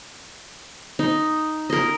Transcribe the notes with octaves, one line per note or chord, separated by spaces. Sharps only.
D#4
A#4 D#5